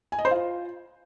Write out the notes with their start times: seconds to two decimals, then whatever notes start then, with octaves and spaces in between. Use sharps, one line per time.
0.12 G#5
0.18 D#5
0.25 C5
0.31 F4